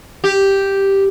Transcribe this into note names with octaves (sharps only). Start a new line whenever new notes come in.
G4